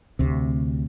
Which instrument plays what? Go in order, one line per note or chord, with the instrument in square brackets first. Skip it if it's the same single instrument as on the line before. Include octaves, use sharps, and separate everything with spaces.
[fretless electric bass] D2 C3